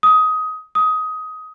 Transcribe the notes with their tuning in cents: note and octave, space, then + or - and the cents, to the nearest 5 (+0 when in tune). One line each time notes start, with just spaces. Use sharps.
D#6 +15
D#6 +15